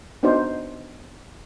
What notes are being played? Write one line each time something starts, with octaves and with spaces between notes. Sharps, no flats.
B3 D4 D#4 F#4 C5